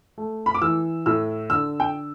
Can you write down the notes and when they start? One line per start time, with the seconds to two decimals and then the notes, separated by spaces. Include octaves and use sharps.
0.18 A3
0.46 B5
0.55 D6
0.62 E3 E6
1.06 A2 E6
1.50 D3 E6
1.80 G5